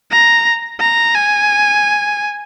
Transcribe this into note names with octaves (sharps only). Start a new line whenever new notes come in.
A#5
A#5
G#5